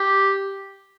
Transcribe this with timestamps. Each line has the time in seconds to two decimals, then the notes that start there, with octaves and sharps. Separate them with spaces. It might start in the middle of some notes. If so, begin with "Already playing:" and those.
Already playing: G4